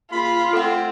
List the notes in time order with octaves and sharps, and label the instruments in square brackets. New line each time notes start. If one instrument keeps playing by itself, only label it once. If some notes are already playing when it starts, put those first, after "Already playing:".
[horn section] C#3 A#3 B5 [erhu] F4
[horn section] A3 C4 [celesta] A4 F#5